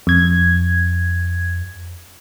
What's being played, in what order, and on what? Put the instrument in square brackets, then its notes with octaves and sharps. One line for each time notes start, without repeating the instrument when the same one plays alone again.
[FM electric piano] F2 G#6